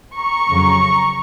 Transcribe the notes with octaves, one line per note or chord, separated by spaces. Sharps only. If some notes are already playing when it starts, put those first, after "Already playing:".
A#5 C#6
F2 C#3 F#3